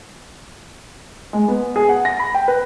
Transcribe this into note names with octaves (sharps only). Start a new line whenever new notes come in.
G#3
B3
G#4
F#5
A#6
B5
G5
B4